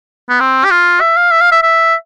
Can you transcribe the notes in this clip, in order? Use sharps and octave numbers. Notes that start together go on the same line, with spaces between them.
B3
C4
G4
F4
E5
F5
E5
F5
E5
E5